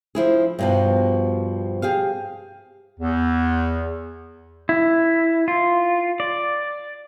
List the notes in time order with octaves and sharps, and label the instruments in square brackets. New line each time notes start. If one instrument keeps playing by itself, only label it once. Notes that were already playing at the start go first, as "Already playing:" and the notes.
[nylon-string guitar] F3 E4 G#4
G2 B2 F3
G4 G#4 F5
[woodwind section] E2
[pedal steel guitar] E4
F4
D5